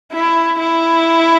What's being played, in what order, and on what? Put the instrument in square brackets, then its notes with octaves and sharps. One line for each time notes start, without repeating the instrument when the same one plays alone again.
[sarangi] E4
E4